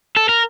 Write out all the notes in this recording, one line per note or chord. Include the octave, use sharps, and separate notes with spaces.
A4
A#4